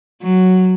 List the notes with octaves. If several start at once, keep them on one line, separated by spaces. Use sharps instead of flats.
F#3